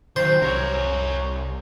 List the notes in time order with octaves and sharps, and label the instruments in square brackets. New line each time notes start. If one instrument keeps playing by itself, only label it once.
[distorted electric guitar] D#3 F#3 [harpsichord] C5
[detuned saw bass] C2 [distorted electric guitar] A#4 C#5